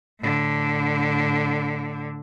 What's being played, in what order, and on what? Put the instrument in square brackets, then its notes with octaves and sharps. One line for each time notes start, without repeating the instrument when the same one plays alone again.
[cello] A2 D3